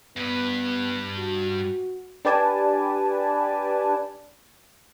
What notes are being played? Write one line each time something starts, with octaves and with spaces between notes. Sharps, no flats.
G2 B3 B4
F#4
D4 G4 B4 D5 G#5 A5